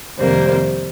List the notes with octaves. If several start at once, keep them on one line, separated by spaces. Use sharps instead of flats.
F2 C3 D#3 G3 A#3 C5